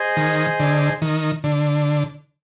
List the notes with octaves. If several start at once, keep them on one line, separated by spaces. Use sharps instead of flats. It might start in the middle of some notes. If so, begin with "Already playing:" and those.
Already playing: G#4 C5 D#5 G#5
D#3
D3
D#3
D3